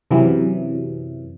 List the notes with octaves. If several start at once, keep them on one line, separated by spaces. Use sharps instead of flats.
F#2 C3 E3 F#3